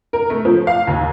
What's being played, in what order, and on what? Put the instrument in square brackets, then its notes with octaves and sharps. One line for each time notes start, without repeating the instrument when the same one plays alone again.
[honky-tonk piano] A#4
A3
F3
F5
D#2